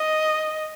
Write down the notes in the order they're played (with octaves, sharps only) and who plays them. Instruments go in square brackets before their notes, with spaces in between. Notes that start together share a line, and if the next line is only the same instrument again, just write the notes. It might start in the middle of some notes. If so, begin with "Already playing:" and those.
Already playing: [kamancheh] D#5